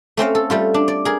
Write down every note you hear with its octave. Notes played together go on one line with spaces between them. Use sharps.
A3 C4 C#4 F5
A4
G3 A3 F4
D4
D5
G#4 A#4